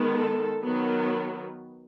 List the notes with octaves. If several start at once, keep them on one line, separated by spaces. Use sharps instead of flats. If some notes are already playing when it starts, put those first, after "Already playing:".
Already playing: D#3 G#3 B3
A4
D#3 F#3 B3